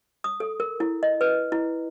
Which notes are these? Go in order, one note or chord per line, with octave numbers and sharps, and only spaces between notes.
D#6
A4
A#4
E4
D#5
B4
E4